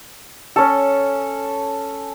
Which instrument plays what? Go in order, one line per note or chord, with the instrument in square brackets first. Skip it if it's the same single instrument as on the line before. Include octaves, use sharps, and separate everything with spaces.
[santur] C#4 A4